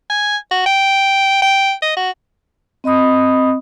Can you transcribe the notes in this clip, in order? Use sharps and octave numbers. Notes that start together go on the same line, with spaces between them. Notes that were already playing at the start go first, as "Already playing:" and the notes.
G#5
F#4
G5
G5
D#5
F#4
C4 D#5 B5 D#6